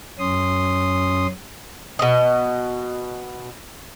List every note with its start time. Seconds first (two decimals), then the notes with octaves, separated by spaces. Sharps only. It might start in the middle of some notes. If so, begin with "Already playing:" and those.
0.19 F#2 C#4 C6 D#6
1.99 B2 D#5